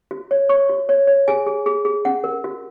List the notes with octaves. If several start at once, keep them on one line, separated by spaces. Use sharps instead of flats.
F#4
C#5
C#5 C#6
F#4
C#5
C#5
G#4 G#5
G#4
G#4
G#4
C#4 F#5
A#4
F#4